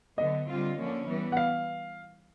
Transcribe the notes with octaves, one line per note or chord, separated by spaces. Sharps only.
D3 F#3 B3 D#5
D3 G3 C4 F4
D3 F3 A#3 C#4
E3 G3 B3
F#5
F5